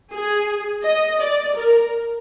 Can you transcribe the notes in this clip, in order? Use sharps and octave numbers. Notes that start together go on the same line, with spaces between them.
G#4
D#5
D5
A#4